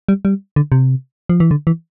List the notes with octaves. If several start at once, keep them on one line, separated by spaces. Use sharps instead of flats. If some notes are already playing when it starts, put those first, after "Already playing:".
G3
G3
D3
C3
F3
E3
D3
E3